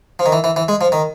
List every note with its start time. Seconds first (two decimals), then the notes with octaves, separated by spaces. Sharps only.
0.19 F3
0.26 D#3
0.32 E3
0.44 E3
0.56 E3
0.68 G#3
0.81 F3
0.92 D#3